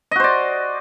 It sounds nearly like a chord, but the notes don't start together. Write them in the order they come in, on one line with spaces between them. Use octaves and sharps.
D#5 F#4 C5 D5